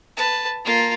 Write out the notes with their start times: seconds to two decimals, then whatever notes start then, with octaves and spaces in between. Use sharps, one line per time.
0.17 B4 A5
0.65 A#3 F4